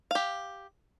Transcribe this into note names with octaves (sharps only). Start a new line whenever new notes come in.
G4 F5